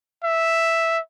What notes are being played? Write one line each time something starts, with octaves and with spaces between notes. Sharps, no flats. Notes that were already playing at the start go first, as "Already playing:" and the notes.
E5